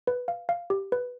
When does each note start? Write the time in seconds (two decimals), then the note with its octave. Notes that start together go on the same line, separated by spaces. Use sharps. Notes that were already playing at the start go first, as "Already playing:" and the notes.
0.07 B4
0.28 F5
0.49 F5
0.70 G4
0.92 B4